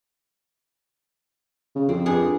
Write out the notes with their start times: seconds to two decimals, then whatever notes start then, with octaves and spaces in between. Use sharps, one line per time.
1.76 C#3
1.89 F2 C4
2.06 G2 G#4